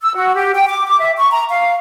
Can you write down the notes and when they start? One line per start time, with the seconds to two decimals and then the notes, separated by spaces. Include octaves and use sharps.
0.02 E6
0.15 F#4
0.34 G4
0.54 G5
0.68 D6
0.85 D6
1.00 E5
1.17 C#6
1.31 A#5
1.50 F5